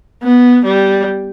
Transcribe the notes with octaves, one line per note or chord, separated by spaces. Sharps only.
B3
G3